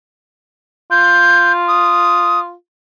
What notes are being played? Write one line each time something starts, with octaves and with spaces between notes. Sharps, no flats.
F4 G6
D#6